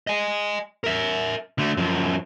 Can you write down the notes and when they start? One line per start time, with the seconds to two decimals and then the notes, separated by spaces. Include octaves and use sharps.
0.07 D#5 G#5
0.84 A#4 E5
1.58 D3 A3
1.77 F#2 F3